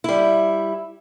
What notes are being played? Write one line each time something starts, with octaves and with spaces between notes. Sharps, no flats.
G3 E4